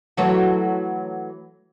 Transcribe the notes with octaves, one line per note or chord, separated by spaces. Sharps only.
E3 F#3 A3